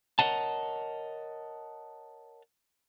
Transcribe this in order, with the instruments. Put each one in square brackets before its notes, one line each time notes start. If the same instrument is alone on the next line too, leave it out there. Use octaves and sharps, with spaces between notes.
[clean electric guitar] A#4 B4 C#5 D#5 F#5 A5